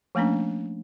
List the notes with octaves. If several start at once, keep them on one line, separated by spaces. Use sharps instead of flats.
F3 A3 A#3 C#4 D4